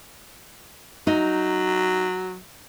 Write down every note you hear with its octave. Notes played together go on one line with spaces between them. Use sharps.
F#3 D#4